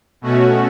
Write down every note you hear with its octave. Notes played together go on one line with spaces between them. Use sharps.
B2 A3 C#4 F#4